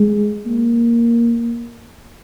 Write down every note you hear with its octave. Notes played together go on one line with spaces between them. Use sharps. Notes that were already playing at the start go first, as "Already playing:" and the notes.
Already playing: G#3
A#3